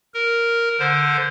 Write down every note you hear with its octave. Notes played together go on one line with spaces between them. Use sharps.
A#4
D3 C5